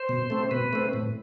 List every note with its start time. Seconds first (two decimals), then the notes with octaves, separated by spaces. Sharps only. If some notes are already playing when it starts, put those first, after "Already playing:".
Already playing: C5
0.09 B2
0.30 A3 C4
0.51 B2 B4
0.73 A3 C4
0.93 A2